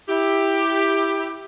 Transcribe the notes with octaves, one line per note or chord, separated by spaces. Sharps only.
E4 G4